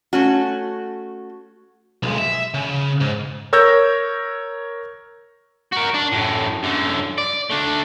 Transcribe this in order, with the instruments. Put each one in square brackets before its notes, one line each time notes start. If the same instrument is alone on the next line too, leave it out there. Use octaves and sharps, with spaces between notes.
[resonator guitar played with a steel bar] A3 C#4 F#4
[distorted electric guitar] B1 G#3
E5
C#3
G#2
[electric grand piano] A#4 C#5 E6 G6 G#6 A#6
[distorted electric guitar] F#4 A#4
D4
F#2 A2
F#2 D3
D5
A3 D4